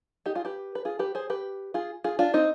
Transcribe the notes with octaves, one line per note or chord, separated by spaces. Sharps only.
D#4 G4
F4 G#4
G4 B4
B4
F4 G#4
G4 B4
G#4 C5
G4 B4
F4 G#4
F4 G#4
D4 F4
C4 D#4